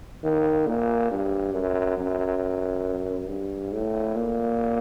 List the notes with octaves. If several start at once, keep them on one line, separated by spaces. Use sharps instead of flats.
D#3
A#2
G2
F#2
F#2
G2
A2
A#2